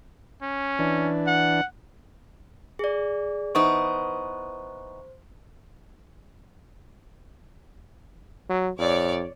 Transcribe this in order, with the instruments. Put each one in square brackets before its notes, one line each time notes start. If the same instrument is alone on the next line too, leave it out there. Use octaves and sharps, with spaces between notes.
[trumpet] C#4
[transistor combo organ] E3 D4
[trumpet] F#5
[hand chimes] G#4 D5
[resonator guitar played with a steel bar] E3 B3 D#4 [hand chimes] C5 [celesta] C#6
[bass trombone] F#3
[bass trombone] F2 [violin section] C#5 D5